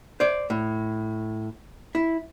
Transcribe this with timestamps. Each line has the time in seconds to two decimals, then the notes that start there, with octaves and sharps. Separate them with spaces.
0.20 C5 D5
0.50 A2
1.95 E4